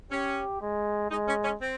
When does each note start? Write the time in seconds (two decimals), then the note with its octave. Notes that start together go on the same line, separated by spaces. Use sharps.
0.11 C#4 G4
0.61 G#3
1.11 G#3 D#4
1.28 C#4
1.44 C#4
1.62 C4